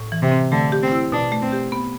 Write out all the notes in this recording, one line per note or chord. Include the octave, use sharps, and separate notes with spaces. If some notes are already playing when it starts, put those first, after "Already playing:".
Already playing: A2
E3
C3
C4
D3 A3
G4
C4
E4
B2 D4
A3
C4
G4
B3